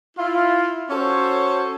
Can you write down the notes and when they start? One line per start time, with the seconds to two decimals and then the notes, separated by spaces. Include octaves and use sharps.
0.17 E4 F4
0.90 C#4 F#4 A4 C5 C#5